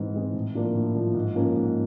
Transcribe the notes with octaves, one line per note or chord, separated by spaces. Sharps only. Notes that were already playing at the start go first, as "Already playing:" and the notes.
Already playing: G#2 E3 G#3 C4
E3 G#3 C4
A2
F3 A#3 D4 F4
A2
F3 A#3 D4 F4
G#2
F3 A#3 C#4
G#2